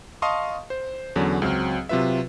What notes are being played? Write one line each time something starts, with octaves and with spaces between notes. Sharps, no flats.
D#5 F5 A5 C6 C#6 D#6
C5
E2 D3 F#3 C#4
C#2 F#3 C4 F6
C3 F#3 F4 B4 E5